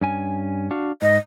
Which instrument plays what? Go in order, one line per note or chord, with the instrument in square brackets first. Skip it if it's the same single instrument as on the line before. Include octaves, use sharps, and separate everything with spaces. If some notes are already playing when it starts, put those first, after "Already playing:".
[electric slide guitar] G2 C#4 G#5
D4 F#4 F5
[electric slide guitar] G#2 [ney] D#5